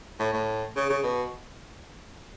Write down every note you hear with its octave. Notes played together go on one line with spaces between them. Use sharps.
A2
A2
C#3
C#3
B2